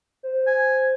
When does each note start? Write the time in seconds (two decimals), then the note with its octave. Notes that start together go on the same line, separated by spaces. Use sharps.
0.23 C5
0.47 G#5